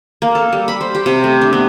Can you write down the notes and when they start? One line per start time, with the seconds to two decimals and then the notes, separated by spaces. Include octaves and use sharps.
0.22 A#3
0.35 A4
0.53 G3
0.68 B5
0.81 C5
0.95 G4
1.06 C3
1.24 A3
1.41 D4
1.53 B3